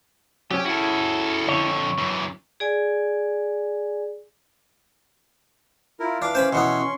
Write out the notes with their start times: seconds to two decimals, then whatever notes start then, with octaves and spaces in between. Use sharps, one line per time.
0.51 F#3 B3 C#4 G4
0.65 C#4 E4 F#4 G#4 A4
1.48 F2 D3 C#5
1.98 F#2 E3
2.60 G#4 D5 G#5
6.00 E4 F4 A#4
6.22 E3 D4 F5 D6
6.35 C#4 C5 G#5 B5
6.53 B2 E3 B3 C6 C#6